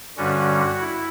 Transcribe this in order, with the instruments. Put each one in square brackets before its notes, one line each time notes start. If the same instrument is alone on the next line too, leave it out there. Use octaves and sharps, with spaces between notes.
[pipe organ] G2 D3 G3 C#4 F#4
E4